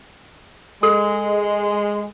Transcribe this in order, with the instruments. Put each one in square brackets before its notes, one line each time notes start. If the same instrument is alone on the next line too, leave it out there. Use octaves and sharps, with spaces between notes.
[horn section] G#3 [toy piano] A4